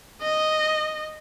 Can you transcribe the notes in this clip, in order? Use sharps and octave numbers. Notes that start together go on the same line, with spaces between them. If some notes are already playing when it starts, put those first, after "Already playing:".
D#5